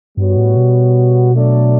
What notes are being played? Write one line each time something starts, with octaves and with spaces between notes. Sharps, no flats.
G2 G3 B3 F#4 C#5
A2
B2
F#3 A3 D4 A4 D5